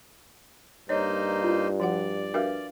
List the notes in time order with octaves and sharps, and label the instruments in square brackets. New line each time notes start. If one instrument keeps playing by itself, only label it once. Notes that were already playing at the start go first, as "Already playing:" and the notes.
[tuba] G2 [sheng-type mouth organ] A#3 D#4 C5 [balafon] C#5 D#5
[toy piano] E4 F4
[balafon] F3 F#4 F#5 [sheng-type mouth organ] D5
[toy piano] D4 B4 F5 [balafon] F#4 A#4 E5